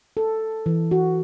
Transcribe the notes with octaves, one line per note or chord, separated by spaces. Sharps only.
A4
E3
F#4